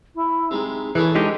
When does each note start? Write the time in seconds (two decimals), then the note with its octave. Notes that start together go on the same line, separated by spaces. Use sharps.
0.15 E4
0.51 C3 G#3 D#4
0.95 E3 E4 G#4 A4 C#5
1.15 G#3 D4 D#4 G4